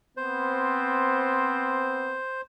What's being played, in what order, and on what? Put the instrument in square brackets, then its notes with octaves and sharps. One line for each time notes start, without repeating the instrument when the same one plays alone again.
[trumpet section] B3 C4 [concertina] C5